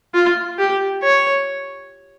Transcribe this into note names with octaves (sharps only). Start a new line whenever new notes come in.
F4
G4
C#5